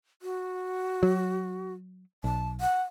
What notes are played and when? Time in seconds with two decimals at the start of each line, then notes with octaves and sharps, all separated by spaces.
0.22 F#4
1.03 F#3
2.24 B1 A5
2.61 F#5